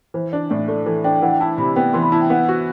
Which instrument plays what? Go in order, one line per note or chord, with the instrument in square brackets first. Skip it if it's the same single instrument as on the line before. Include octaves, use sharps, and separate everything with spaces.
[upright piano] E3 [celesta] C5
[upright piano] D4 [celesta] D5
[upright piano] A2 [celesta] D5
[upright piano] A3 [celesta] D5
[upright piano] E3 [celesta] A4
[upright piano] D4 [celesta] G5
[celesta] G5
[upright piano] E3 [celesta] F#5
[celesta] G5
[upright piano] E4 [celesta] A5
[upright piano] C3 [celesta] B5
[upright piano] B3 [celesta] G5
[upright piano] E3 [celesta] C6
[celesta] B5
[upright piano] E4 [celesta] A5
[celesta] G5
[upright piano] B3 [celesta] F#5
[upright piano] F#4